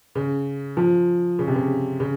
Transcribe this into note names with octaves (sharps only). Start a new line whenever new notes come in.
C#3
F3
C#3
C3
C#3
C#3